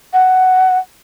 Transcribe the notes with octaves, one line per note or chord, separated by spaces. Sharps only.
F#5